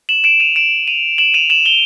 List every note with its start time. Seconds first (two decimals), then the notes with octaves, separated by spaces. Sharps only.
0.09 E7 F#7
0.24 D7 E7
0.40 D#7 F7
0.56 D7 E7
0.88 D#7 F7
1.18 E7 F#7
1.34 D#7 F7
1.50 E7 F#7
1.66 F7 G7